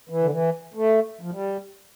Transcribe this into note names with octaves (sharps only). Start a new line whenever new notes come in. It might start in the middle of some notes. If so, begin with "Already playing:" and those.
E3
D3
E3
A3
F3
G3